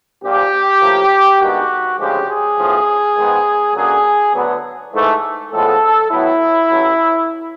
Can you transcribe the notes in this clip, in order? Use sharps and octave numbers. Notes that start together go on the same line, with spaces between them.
A#1 A#2 F3 G4
A2 F3 A#3
G2 D#3 G#3 B3 F#4
D2 C#3 F3 G#3 G4
G#4
B1 A2 F3
G#2 D#3 G#3 B3
F#2 D3 F#3 A#3 G#4
D2 D3 F#3 B3
G#2 E3 A3
A2 F3 G#3 B3 A4
A2 F#3 B3 E4
A1 A2 F#3